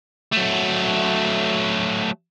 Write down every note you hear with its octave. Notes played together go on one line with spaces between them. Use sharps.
F#3 A3